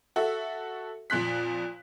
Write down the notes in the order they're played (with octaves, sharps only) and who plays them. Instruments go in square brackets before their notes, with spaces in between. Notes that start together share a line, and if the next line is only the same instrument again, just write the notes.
[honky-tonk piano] F#4 A4 E5
F2 A#2 C6 F#6 B6